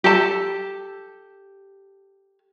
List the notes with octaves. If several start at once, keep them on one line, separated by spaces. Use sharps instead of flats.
G4 A4 A5